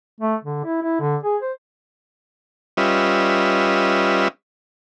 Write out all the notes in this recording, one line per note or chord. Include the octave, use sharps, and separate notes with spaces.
A3
D3
E4
E4
D3
G#4
C5
G3 C#4 F4 B4 D#5 E5